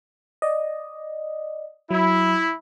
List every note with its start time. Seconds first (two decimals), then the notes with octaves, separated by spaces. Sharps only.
0.42 D5 D#5
1.91 F#3 E4